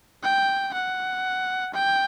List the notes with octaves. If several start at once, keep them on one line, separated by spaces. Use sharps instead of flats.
G5
F#5
G5